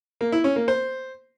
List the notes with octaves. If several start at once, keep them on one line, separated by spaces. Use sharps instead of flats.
A#3
E4
C#4
A#3
C5